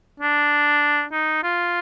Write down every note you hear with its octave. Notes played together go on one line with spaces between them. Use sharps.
D4
D#4
F4